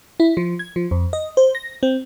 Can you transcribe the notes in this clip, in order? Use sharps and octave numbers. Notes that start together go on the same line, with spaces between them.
E4
F3
G#6
F3
F2
D#5
C5
A#6
C4